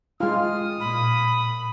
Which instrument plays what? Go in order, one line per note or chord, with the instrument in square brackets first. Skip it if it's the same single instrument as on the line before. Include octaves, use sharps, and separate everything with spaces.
[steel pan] G#3 F4 [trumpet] D#6 [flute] F6
[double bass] A#2 [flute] B5